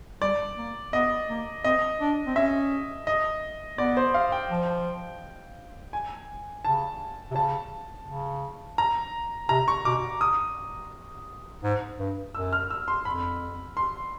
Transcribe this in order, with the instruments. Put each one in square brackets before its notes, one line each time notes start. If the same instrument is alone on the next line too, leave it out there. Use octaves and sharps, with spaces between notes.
[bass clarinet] G3 [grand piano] D5
[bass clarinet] A#3
[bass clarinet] B3 [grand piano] D#5
[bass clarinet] A#3
[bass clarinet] C4 [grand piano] D#5
[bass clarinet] D4
C4
[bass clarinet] C#4 [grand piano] E5
[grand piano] D#5
[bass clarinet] B3 [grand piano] D5
[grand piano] C5
F5
G5
[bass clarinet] F3
[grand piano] G#5
[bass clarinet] C#3 [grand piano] A5
[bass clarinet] C3
[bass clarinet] C#3 [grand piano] A5
[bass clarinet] C#3
[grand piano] A#5
[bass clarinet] C3 [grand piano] A#5
[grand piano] C#6
[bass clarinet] B2 [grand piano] D6
[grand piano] D#6
[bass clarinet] G#2
G2
[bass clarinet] F#2 [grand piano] E6
[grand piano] F6
E6
C6
[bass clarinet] F2 [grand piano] B5
[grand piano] C6